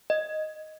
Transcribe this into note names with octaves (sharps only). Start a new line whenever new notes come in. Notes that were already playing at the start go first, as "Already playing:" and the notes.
D#5